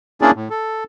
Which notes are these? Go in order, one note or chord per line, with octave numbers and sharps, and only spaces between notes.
A#3 C#4 D4 E4 G#4 D5
A2
A4